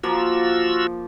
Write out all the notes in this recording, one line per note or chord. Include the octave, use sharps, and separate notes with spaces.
F3 A#3 F4 F#4 E6